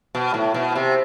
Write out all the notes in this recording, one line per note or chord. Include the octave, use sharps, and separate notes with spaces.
B2
A2
B2
C3